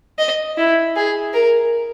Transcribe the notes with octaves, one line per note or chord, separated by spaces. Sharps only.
D#5
E4
G#4
A#4